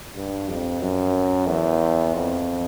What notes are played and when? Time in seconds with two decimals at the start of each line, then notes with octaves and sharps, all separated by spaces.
0.16 G2
0.49 F2
0.81 F#2
1.47 E2
2.14 F2